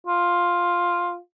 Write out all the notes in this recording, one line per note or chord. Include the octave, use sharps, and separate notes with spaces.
F4